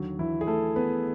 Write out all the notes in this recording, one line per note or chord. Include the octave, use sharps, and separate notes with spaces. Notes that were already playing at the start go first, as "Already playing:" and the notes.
Already playing: D#2 D3 F#3
E3 E4
G#4
A3 A4
B3 B4